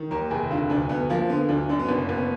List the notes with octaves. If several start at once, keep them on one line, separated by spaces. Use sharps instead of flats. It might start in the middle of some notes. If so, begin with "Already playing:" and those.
Already playing: D#3
D#2 A#4
F1 G#4
D3 F4
D2 D4
D2 B3
F3 A#3
D3 B3
D2 D4
F#2 D4
B3
F#1 D4
F#1 B3